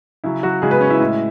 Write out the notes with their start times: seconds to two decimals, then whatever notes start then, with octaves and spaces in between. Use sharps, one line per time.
0.24 C#3 F#3 E4
0.43 F#3 F#4
0.62 C#3 F#3 G#3 G#4
0.71 B3 B4
0.81 C#4 C#5
0.90 E4 E5
1.00 A2 G#3